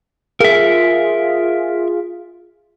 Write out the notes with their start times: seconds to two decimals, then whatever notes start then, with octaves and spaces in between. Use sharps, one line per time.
0.40 F4 G#4 A#4 E5